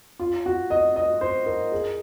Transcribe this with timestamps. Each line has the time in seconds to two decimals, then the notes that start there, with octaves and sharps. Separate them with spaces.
0.20 F4
0.46 F#4
0.70 D#5
0.96 D#5
1.21 C5
1.46 A#4
1.72 G#4